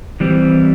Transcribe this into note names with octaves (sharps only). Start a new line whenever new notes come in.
E3 G3 C4